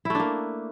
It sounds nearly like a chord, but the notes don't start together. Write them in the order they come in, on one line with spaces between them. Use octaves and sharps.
E4 A3 D4 A#3